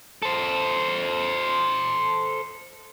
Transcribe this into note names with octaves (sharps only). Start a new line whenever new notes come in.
A4 C5